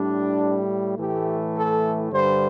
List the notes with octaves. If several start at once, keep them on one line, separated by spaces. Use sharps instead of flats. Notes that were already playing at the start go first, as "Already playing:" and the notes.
Already playing: A2 G3 D4
A2 E3 A3 G4
A4
G2 D3 G3 C5